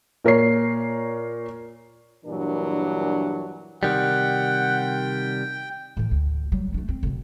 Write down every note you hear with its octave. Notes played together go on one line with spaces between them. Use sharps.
A#2 A#4 C#5 C7
G2 A#2 E3 F#3 D4 A#4
C3 D#3 G3 F#5 G5
A2 E3
D2
F#3 G3
A3 D4
C4
D1 B1